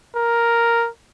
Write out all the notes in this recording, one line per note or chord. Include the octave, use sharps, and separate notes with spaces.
A#4